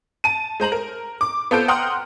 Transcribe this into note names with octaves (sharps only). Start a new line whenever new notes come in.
A5 D#7
G#3 C5 A#5 F#7
A#4
D6
B3 F4 A4 C5 G6 D7
F#5 G5 A#5 C6 D#6 F6